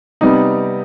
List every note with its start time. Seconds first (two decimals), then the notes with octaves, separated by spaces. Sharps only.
0.21 C3 G3 B3 D#4